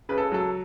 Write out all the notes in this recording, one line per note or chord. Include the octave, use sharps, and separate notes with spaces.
C#3 B4
A4
F#3 A4